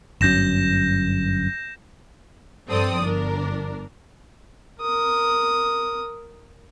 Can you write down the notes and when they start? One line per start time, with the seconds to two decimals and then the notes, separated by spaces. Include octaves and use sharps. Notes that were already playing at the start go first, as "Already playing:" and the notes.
0.21 G1 F#2 G6 A#6 E7
2.68 G2 F3 C4 A4 D5 D#6
3.02 G1 D4 A#4
4.81 A#4 D#6